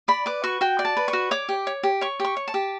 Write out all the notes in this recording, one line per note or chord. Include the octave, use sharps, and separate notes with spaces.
D5 B5
B4 D6
F#4 C#6
F#4 G5
D5
A5
B4
C#6
F#4
C#5 D6
G4
C#5
G4
C#5 C#6
G4
C#6
C#5
A5
G4